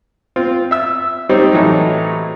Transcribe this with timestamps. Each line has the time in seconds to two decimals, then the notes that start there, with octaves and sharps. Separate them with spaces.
0.36 C4 F4
0.71 E5 E6
1.29 G3 C4 D#4 G4 C5 C#5
1.52 A2 E3 F#3 D#4